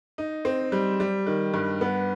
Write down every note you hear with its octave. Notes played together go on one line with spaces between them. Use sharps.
D#4
C4
G3
G3
D#3
G2
B3